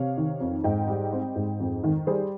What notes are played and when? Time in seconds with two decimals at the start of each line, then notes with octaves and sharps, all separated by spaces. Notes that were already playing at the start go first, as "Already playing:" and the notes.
Already playing: C3 C#5 F5
0.17 D#3
0.40 F2
0.64 G#2 D#5 G5
0.88 G3
1.13 C4
1.36 G#2
1.60 F2
1.84 D#3
2.07 G3 G#4 C5